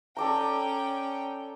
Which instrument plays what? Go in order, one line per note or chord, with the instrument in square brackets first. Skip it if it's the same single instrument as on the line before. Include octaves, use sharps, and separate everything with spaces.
[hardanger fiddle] C#4 G5 [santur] A4 D5 A#5